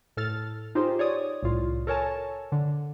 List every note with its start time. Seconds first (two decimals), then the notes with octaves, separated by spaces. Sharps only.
0.17 A2 A4 F6 A6
0.75 D#4 F4 G4 G#4 C5
0.99 C#5 D5 D#6
1.43 C2 A2 F4
1.87 A4 A#4 C#5 G#5 A5
2.52 D3